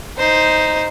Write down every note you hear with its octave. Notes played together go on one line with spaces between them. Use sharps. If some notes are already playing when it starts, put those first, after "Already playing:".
D#4 C5